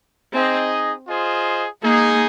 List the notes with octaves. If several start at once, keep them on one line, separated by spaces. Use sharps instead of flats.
C4 D#4 G#4 D#5
F4 G#4 C5 D#5
G#3 A#3 D#4 G#4